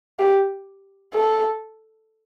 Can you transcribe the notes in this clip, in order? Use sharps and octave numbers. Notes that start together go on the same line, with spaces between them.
G4
A4